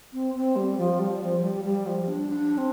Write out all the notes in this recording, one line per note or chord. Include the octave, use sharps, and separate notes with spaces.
C4
C4
G3
F3
G3
F3
G3
G3
F3
D4
D4
C4